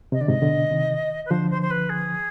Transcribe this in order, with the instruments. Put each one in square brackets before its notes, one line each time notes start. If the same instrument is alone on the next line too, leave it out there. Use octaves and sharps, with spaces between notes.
[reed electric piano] C3 [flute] D#5
[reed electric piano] D3 [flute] D5
[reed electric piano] G#2 C3 [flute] D#5
[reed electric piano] B2 D3
C3 D#3
[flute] B4
[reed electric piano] D3 F3 [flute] C5
[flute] C5
C5
B4
G#4